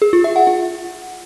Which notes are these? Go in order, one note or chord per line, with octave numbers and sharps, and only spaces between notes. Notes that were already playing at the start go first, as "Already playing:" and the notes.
G#4
F4
E5
F#5
F4